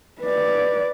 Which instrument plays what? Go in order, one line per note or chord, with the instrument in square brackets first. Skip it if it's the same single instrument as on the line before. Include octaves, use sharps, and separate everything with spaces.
[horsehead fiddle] B4 D5